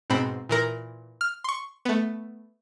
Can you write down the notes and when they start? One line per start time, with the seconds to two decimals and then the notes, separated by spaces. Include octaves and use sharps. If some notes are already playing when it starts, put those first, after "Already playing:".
0.10 G#2 B2 C4 B5
0.49 A#2 E3 A#4
1.21 F6
1.44 C6 C#6
1.85 A3 B3